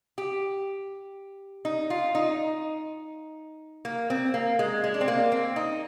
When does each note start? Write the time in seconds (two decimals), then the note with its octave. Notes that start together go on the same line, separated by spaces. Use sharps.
0.18 G4
1.65 D#4
1.90 F4
2.15 D#4
3.85 A#3
4.10 C4
4.34 A#3
4.59 G#3
4.84 G#3
4.94 D4
5.01 C4
5.08 A#3
5.32 C4
5.56 D#4